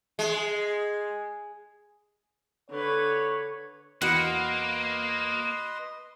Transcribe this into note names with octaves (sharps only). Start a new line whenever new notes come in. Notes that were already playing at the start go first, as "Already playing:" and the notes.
G#3
D3 B4 C#5
E2 A#3 F#4 B4 D#5 F#5 B5 C6